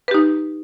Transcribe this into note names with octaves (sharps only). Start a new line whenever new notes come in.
D#4 G4 B4